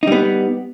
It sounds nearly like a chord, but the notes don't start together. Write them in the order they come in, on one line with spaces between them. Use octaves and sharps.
D#4 G3 B3